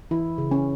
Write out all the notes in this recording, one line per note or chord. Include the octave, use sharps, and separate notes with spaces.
E3 E4
C#3
C#4